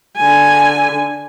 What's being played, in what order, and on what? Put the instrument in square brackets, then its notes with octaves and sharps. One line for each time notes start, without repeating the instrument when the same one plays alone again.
[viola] D3 G#5